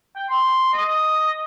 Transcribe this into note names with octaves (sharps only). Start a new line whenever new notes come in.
G5
C6
D#5